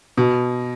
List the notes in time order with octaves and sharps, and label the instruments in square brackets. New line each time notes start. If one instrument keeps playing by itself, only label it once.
[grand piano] B2